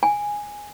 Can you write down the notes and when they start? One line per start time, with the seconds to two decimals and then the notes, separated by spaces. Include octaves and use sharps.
0.03 G#5